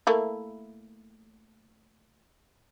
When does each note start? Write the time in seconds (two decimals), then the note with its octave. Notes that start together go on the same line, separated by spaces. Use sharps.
0.07 A3 A#3 E4